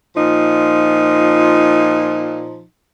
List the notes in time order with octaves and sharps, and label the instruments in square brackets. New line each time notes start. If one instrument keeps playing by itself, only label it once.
[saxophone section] A#2 F3 D#4